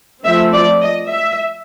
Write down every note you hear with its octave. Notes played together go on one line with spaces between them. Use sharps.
F3 A3 C4 E5
D5
D#5
E5